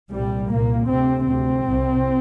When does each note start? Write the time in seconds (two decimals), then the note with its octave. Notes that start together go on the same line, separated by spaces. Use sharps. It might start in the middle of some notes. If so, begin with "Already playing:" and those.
0.11 C2 A#2 G3
0.50 C2 A#2 A#3
0.88 D2 C3 C4
1.26 D2 C3 C4
1.66 C2 C3